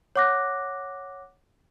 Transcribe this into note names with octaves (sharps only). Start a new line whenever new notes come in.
C#5 F#5 D6 F#6 A#6